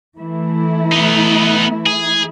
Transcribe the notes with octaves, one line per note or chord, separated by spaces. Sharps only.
E3 A3 E4
B3 D#4
G#4